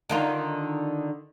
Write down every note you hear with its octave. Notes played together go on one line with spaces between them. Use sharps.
D3 D#3 F4